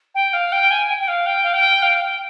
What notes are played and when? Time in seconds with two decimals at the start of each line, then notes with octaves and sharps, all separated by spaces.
0.14 G5
0.33 F5
0.52 G5
0.70 G#5
0.89 G5
1.00 G5
1.08 F5
1.26 G5
1.43 F5
1.53 G5
1.82 F5
2.01 G5